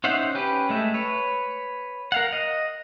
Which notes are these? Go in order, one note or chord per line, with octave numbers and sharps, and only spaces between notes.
C#4 D#4 C5 E5 F#5
C#4 G4 B4
G#3 A3 E5
B4 C#5
A#4 F5 F#5
D#5